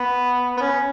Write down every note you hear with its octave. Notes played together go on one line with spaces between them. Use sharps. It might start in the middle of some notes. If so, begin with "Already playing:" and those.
Already playing: B3
B3
C#4